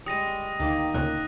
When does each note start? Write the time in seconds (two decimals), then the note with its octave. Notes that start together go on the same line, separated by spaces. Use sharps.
0.06 G3 G#3 D#6 A#6 C#7 D#7
0.60 D2 D#3 A#3 D6
0.94 D2 A#2 C#3 F#6